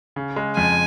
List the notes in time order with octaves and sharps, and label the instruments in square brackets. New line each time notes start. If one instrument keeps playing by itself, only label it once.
[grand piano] C#3
G#3
[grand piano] F2 [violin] G#5